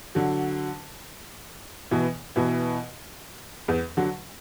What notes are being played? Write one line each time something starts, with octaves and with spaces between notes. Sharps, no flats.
D3 F#3
B2 E3
B2 E3
E2
D3 F#3